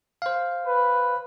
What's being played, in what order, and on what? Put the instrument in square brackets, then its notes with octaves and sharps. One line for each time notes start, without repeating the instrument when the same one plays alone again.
[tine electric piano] C5 F5
[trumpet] B4